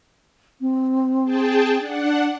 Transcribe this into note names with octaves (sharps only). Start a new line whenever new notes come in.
C4
G#4 G5 A5
D4 F#5